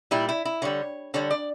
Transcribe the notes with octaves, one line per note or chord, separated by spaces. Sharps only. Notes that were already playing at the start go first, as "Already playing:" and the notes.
A#2 G3 E4
E4
E4
D3 G3 C#5
D3 G3 C#5
D5